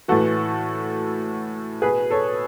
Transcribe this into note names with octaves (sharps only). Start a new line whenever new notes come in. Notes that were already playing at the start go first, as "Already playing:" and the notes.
A2 E3 F#4 A4
B2 G#4 B4
A4 C#5